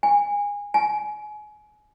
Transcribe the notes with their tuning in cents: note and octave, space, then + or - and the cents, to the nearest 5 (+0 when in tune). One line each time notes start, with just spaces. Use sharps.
G#5 -25
G#5 +25